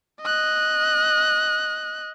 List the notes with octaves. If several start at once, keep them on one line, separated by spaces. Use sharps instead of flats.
D#5 F#6